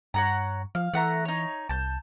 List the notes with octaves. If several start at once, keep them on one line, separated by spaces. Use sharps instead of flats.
G2 C#5 F#5 A#5
F3 F5
E3 A3 F#5 A#5
D#4 C#5
C2 A5 G6